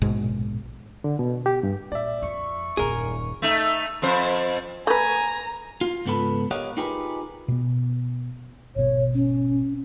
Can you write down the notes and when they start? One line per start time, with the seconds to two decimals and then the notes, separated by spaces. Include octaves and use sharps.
0.02 A#1 G#2 B2 G#3
1.04 D3
1.19 B2
1.46 G4
1.63 G2
1.92 A#2 D5 E5
2.22 F2 C#6
2.77 D#1 F#2 G#4 A#4
3.42 A3 D#4
4.02 F2 C5
4.87 A3 B4 G#5 A#5
5.81 F4
6.06 C#2 G#2 B3 A4 B5
6.51 G4 A#4 C#5 D#5 F5 F#5
6.77 D#4 F4 G4 G#4 A#4 B4
7.48 B2 B3
8.76 G#1 B2 C#5
9.14 C#4